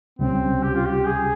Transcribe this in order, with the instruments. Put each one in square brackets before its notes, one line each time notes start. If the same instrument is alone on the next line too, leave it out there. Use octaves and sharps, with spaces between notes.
[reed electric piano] C#2 C3 G3 C#4 [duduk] C4
[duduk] G4
F4
G4
G#4